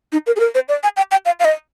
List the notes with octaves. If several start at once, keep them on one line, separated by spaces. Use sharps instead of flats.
D#4
A#4
G#4
A#4
C5
D5
G#5
G5
G5
F5
F5
D#5